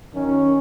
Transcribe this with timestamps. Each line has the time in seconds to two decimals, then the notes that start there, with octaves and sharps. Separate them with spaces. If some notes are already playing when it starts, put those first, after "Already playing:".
0.14 F#2 D#3 C#4